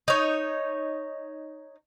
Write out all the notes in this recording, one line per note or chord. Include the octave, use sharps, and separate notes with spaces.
D#4 C#5